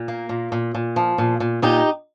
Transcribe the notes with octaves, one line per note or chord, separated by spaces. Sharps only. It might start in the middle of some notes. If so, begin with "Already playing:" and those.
Already playing: A#2
A#3
A#2
A#2
A#2
F3
A#2
A#2
A#2 D#4 G4